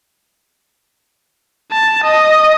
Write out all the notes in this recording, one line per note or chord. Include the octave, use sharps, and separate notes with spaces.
A5
D#5